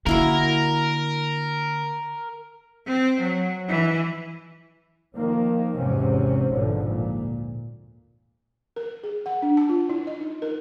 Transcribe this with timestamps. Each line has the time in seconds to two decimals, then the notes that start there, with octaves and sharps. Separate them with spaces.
0.06 D3 A#3 E4 F#4 A#4
2.86 C4
3.21 F#3
3.69 E3
5.16 D#3 F3 A#3
5.76 G#1 E2 G#2 C3 C4 C#4
6.50 G#1 D2 G#2 B2 D3 F3
6.86 A#2
8.76 A#4
9.04 G#4
9.26 F#5
9.42 D4
9.57 A5
9.69 F4
9.90 E4
10.07 D#5
10.20 D#4
10.42 A#4